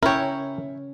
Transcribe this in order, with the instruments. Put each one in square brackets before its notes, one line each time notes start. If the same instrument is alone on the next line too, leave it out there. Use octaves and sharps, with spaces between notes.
[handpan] C#4 [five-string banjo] E4 C#5 [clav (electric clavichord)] A#4 G5